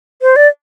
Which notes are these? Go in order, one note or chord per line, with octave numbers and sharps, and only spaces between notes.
C5
D5